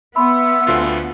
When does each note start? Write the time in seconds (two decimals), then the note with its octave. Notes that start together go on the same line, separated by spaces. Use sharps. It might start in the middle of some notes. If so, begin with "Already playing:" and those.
0.16 B3 E5 B5 C6
0.67 D2 D3 F4 F#4 C5 G#5